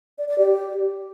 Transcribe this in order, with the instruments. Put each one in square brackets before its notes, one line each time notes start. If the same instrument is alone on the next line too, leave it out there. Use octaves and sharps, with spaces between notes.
[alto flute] D5
D5
G4